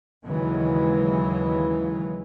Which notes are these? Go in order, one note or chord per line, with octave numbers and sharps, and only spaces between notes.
D#2 C#3 E3 F#3 G#3